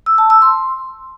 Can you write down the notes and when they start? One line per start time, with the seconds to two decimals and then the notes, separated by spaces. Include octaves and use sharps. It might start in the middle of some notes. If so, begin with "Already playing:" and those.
0.06 E6
0.18 A5
0.30 E6
0.42 C6